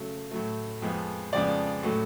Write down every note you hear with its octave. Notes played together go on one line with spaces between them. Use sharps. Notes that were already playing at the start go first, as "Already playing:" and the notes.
Already playing: C#3 F#3 A3
A2 F#3 A3
F2 F3 G#3 B3
F2 C#3 F3 G#3 B3 D5
A2 F#3 A3